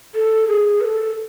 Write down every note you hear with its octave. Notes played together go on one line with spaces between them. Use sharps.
A4
G#4
B4
A4